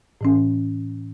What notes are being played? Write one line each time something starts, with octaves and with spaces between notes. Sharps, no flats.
A2 E3 C#4